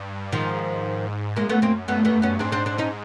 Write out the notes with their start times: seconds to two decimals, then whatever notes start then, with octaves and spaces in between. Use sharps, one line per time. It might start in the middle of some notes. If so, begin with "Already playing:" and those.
Already playing: G2
0.32 G#2 D#3 F3
1.36 F#2 G#3 A#3
1.49 A3 B3
1.62 A#3 C4
1.88 G2 A3 B3
2.05 A3 B3
2.22 B3 C#4
2.39 G#2 C4 D4
2.52 C4 D4
2.66 C4 D4
2.78 C#4 D#4